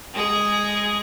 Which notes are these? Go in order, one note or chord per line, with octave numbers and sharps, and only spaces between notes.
G#3 G#4